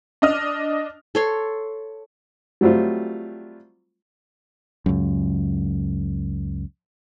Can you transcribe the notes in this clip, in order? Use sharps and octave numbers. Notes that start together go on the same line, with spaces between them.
D4 D#5 F6
A4 C#5 C6
F#3 G3 A3 C4 F4
C#2 F#2